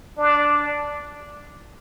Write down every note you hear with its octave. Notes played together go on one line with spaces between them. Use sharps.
D4